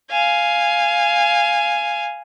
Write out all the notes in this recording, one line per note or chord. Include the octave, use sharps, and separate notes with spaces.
F5 G#5